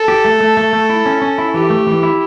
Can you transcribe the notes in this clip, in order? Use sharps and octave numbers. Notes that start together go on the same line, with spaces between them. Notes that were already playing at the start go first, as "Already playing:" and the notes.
Already playing: A4
G4
A3
A3
A3
A3
E4
C#4
C#4
E4
E3 G4
A3
E3
E4